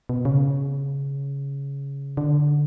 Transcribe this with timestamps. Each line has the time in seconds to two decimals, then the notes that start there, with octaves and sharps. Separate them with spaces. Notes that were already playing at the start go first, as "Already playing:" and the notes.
0.09 B2
0.25 C#3
2.17 D3